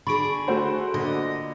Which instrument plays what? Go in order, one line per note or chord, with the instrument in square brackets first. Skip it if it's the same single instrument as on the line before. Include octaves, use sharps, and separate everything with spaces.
[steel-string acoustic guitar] D3 G#4 [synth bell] B5 C#6 D7
[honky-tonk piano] A3 F#4 C5
[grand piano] A#2 D3 [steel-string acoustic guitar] D#5